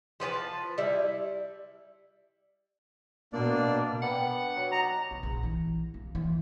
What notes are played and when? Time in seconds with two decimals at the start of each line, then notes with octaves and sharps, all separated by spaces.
0.20 F3 B4 C#5 A5
0.78 G3 E4
3.33 B2 A#3 D4 D5
4.02 B3 D4 G4 F#5 B5
4.56 F#3
4.72 D#4 A5 A#5
5.11 B1
5.23 A#1
5.43 E3
5.94 A#3
6.15 E3